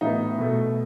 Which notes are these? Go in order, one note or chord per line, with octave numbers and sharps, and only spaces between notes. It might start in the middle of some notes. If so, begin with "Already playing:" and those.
A2 E3 B3 D#4
B2 A3